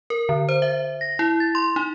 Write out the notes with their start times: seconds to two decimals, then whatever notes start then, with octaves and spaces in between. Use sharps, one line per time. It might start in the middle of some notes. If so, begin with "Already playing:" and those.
0.10 A#4
0.29 D3
0.49 C5
0.62 E5
1.01 A#6
1.19 E4
1.40 A6
1.55 C6
1.76 D#4